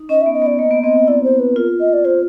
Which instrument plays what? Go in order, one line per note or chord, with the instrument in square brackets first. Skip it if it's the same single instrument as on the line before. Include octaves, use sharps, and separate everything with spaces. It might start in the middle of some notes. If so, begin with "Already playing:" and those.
Already playing: [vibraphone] D#4
[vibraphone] C#4 [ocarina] D#5
[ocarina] E5
[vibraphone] B3
[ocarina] D#5
[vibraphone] B3 [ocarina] D5
[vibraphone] A#3 [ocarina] D#5
[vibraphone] B3
[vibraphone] C4 [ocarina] D#5
[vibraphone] C4
[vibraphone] E4 [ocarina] D5
[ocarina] C5
B4
[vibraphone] F4 [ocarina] A#4
[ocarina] D#5
D5
[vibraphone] F4 [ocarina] C5